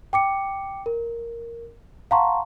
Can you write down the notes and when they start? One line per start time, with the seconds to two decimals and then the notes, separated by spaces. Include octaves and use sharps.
0.13 G5 D6 C#7
0.86 A#4
2.11 F5 F#5 A5 A#5 C6 C#6